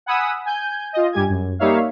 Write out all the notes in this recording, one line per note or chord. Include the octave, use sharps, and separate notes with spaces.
F#5 G#5 B5 D#6 E6
G#5 G6
F4 D#5
G2 G3 G4 G#5 G#6
F#2
G3 A#3 D#4 C#5 E5 F5